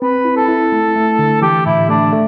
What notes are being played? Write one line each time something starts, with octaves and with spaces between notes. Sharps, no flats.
C4 B4
E4
A4
E4
A3
A3
D3
E3 G4
A2 E4
A3 D4
A3